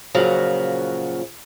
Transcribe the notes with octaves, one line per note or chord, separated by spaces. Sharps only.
A#2 C#3 F3 F#3 F#4